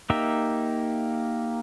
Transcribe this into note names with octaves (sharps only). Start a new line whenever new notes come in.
A#3 D#4 G4 E5